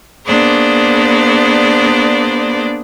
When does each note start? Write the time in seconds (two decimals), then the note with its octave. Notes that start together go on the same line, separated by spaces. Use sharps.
0.25 A#3 B3 D4 G#4 C5 D5